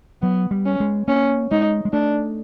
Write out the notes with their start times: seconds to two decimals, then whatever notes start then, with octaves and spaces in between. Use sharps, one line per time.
0.22 F#3 B3
0.51 G3
0.66 C#4
0.80 G#3
1.08 A#3 C#4
1.51 G#3 D#4
1.85 G#3
1.93 A3 D4